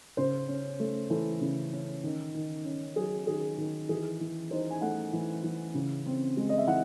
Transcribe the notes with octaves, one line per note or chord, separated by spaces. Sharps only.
C#3 C5
C#4
A3
E3 A4
C#3
C#4
D#3
D#3
C#4
F#3 G#4
D#3 G#4
D#3
E3 G#4
E3
D#4 C5
G#5
A3 F#5
E3
E3
C#3
C4
G#3
D#5
E5
E3 F#5